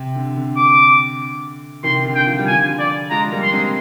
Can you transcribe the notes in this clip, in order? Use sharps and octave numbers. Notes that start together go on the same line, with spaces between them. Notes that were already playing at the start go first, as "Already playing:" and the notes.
Already playing: C3
D3
D3
D6
C3 D#3 C6
D3
G5
F3
G3
D3 F3 G#5
D5
F3 G#3 A#5
G3 A#3
C6
G#3 C4